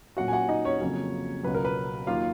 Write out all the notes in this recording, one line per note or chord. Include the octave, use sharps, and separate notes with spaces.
A#2 F#3 C#4 F#4 F#5
G#5
F#4 F#5
D#4 D#5
C#4 C#5
F2 C#3 F#3 A#3 C#4
C#2 B2 F#3 B4
A#4
B4
D#2 D#3 F#3 A#3 F4 F5